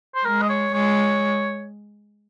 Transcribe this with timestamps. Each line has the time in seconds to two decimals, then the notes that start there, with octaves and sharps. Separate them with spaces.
0.15 C5
0.25 G#3 A#4
0.42 D#5
0.49 C#5
0.73 G#3 C#5